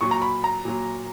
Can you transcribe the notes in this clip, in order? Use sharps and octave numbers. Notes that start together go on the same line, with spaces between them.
A#2 F#3 C#6
A#5
B5
A#5
A#2 F#3